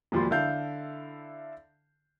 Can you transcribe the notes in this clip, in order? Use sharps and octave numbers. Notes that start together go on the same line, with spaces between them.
E1 D#2 F3 G3 B5 C6
D3 E4 A4 F5 G6